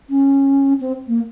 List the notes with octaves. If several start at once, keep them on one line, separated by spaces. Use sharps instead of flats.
C#4
C4
A#3